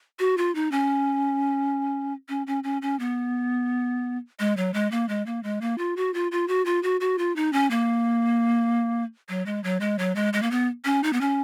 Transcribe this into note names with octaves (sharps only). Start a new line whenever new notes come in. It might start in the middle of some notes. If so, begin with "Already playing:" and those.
F#4
F4
D#4
C#4
C#4
C#4
C#4
C#4
B3
G#3
F#3
G#3
A#3
G#3
A#3
G#3
A#3
F4
F#4
F4
F4
F#4
F4
F#4
F#4
F4
D#4
C#4
A#3
F#3
G#3
F#3
G#3
F#3
G#3
G#3
A#3
B3
C#4
D#4
B3
C#4